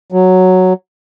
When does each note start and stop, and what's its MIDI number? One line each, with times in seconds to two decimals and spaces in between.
0.12 0.73 54